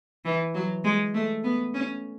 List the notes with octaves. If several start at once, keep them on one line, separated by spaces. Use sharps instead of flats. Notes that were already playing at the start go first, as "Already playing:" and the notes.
E3
F#3
G#3
A3
B3
C#4